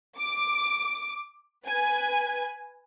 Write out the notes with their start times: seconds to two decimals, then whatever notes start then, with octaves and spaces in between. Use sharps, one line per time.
0.18 D6
1.67 B4 G#5